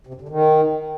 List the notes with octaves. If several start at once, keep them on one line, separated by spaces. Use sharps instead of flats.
C3
F#2
D3
D#3